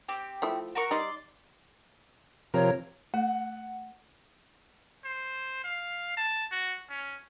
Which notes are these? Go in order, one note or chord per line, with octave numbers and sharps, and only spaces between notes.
C4 G4
F3 A3 E4
F#4 A#4 C#6
G3 D#4 D5 C6
C3 F3 A#4 C#5
A3 F#5
C5
F5
A5
F#4
C#4